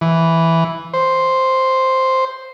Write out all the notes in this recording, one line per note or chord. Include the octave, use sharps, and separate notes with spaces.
E3
C5